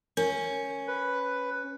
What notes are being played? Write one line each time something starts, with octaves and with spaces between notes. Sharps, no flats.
C#4 A#4
B4